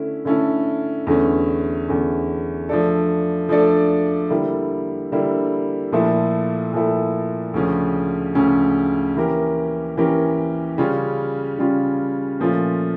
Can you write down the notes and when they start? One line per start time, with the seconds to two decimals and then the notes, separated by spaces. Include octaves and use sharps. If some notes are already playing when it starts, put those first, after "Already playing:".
Already playing: D3 A3 C#4 E4
0.25 D3 A3 C#4 E4 A4
1.07 E2 D3 A3 C#4
1.88 E2 D3 A3 C#4
2.69 F3 A3 D4 A4 D5
3.49 F3 A3 D4 A4 D5
4.30 D3 G3 A#3 E4
5.12 D3 G3 A#3 E4
5.92 A#2 F3 A3 E4 A4
6.73 A#2 F3 A3 E4 A4
7.54 D2 C#3 F3 C#4
8.35 D2 C#3 F3 C#4
9.16 E3 A#3 C#4 G4 A#4
9.97 E3 A#3 C#4 G4 A#4
10.78 C#3 G3 C#4 F4
11.59 C#3 G3 C#4 F4
12.40 A#2 F3 A3 C#4 F4